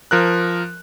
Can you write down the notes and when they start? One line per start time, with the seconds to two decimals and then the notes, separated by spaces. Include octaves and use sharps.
0.11 F3 A#4 F#6